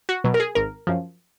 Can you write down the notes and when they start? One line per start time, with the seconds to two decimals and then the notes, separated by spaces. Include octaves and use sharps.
0.09 F#4
0.24 B2 F#3
0.34 A#4
0.40 G#4
0.55 G#1 A#4
0.87 F#2 F3